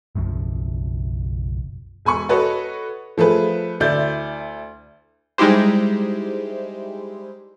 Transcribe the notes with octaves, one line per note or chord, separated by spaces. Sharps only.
F#1 B1 F#2 F3
E1 G#5 B5 C#6
F#4 A4 B4 C#5 D#5
F3 A3 G#4 B4
D2 E4 D5 G6
G3 G#3 D#4 E4 G4 C5